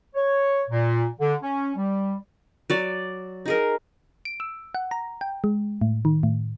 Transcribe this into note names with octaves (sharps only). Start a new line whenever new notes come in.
C#5
A#2
D3
C#4
G3
F#3 D5
D#4 G#4 A#4
D7
E6
F#5
A#5
G5
G#3
A2
D#3
A2